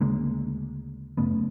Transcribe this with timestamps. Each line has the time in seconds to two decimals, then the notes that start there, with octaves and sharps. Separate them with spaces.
0.01 D2 C#3 G#3 A#3
1.17 F#2 C#3 A3 B3